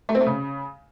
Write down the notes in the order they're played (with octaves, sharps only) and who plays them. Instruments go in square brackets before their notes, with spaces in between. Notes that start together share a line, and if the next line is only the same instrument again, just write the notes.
[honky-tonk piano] A3
C4
A3
C#3